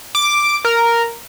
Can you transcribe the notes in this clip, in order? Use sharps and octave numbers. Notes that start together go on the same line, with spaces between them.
D6
A#4